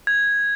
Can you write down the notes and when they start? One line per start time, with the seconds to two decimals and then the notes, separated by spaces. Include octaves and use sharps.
0.07 G#6